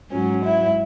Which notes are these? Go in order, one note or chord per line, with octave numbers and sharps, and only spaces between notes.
G#2 F#3 C#4
E4